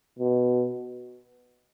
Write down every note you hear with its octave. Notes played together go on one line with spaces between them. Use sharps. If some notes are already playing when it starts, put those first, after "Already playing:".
B2